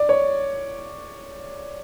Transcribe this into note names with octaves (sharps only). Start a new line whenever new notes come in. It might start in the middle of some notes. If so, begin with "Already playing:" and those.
Already playing: D5
C#5